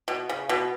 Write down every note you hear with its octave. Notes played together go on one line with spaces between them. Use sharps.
B2
C#3
B2